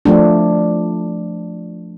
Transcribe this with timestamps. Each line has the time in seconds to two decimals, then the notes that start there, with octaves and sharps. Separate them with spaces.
0.05 F3 A3 D4